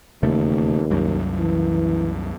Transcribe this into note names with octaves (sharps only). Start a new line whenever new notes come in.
E1 D#2 C#3 A3
C2 F#2
E3